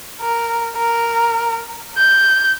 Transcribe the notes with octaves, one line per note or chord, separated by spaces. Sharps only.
A#4
A#4
G6